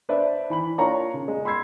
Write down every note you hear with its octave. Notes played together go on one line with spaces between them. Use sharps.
D4 B4 C5 D5 E5
E3 B5 F#7
A#3 D4 F4 A#4 C#5 A#5
C#3
G#3
B5 C6 E6 G#6 C7